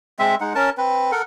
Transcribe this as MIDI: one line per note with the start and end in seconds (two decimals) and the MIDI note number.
0.19 0.35 56
0.19 0.35 60
0.19 0.35 76
0.41 0.53 56
0.41 0.53 63
0.41 0.53 78
0.55 0.70 61
0.55 0.70 70
0.55 0.70 81
0.78 1.11 60
0.78 1.11 71
1.12 1.22 69
1.12 1.22 70
1.12 1.22 78